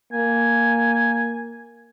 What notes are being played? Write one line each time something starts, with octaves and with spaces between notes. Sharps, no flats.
A#3 G#5